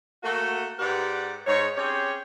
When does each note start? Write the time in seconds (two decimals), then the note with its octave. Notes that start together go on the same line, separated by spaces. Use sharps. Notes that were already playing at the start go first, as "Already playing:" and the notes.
0.23 A3 A#3 F#4
0.79 G#2 G4 B4 D5 F#5
1.47 G#2 C#5
1.76 C4 C#4 G4 G#4 C#5